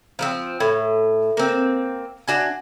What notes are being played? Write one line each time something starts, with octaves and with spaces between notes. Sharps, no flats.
F3 A#3 C4
A2
A#3 C4
D4 F#4 G#5